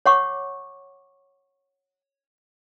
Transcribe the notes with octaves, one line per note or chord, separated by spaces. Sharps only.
C#5 F#5 C#6 D6